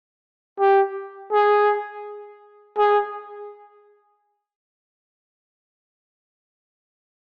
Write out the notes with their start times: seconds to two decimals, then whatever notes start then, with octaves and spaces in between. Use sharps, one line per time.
0.59 G4
1.32 G#4
2.78 G#4